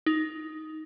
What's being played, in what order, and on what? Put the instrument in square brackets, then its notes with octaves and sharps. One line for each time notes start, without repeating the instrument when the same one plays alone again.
[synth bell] D#4